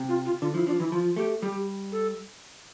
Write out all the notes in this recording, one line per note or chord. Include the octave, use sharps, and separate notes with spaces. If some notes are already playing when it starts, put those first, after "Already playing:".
Already playing: C3
F4
F4
D3 F4
F3 E4
F3 D4
E3 E4
F3 F4
A3 G4
G3 G4
A4